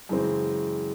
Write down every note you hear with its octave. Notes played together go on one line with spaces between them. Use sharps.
F#2 C#3 E3 G#3 C4